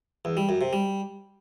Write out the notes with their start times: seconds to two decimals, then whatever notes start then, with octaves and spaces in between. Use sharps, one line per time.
0.25 E2
0.37 G3
0.49 F#2
0.61 C3
0.73 G3